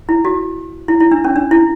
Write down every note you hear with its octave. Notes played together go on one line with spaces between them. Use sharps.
E4
F#4
E4
E4
D4
C#4
D4
E4